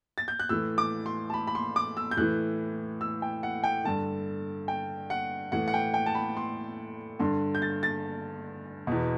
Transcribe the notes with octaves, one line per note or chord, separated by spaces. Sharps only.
A6
G6
F#6
A2 E3 E6
D6
C6
A5
B5
B5
C6
D6
E6
G6
A2 E3 F#6
E6
G5
F#5
G5
G2 D3 A5
G5
F#5
A2 E3 F#5
F#5
G5
G5
A5
B5
C6
G2 D3 C6
G6
A6
A6
E2 B2